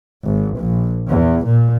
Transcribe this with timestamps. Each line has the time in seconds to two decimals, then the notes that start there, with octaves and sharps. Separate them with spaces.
0.24 G#1
0.57 A#1
1.08 E2
1.46 A#2